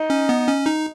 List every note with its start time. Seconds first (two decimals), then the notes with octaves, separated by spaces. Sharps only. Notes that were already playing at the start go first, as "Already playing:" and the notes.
Already playing: D#4
0.10 C#4
0.29 B3
0.48 C#4
0.66 D#4